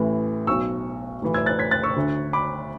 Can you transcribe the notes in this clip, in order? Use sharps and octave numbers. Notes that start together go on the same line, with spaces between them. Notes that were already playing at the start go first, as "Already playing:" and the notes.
Already playing: A1 A2 E3
B1 B2 C#6 E6
B1 A2 E3
E6 G#6
F#6 A6
G#6 B6
F#6 A6
C#6 E6
D2 D3
B5 D6